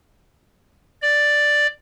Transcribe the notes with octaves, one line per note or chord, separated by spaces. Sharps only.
D5